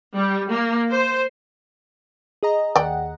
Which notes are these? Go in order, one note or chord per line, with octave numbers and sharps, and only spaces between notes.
G3
A#3
C5
G#4 D#5 A#5
D#2 D5 F#5 G5